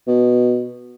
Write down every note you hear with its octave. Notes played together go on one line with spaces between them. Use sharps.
B2